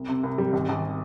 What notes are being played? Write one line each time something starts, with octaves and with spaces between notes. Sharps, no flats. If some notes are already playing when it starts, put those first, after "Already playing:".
Already playing: C2
C3
C2
G3
G#1
G#1